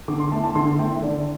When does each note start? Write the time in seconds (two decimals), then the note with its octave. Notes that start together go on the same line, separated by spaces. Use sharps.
0.08 D3 D6
0.20 C6
0.32 A3 A5
0.35 E4
0.44 A5
0.55 D3 C6
0.67 A5
0.79 A3 G5
0.83 E4
0.91 E5
1.02 D3 D5